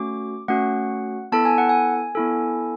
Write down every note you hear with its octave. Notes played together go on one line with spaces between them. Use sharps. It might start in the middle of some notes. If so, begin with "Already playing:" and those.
Already playing: A3 C#4 F#4 D6
A3 C#4 F#4 F#5
B3 E4 A4 A5
G#5
F#5
G#5
B3 E4 A4